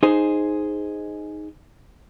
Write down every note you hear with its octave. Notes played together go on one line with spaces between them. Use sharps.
D#4 G#4 C5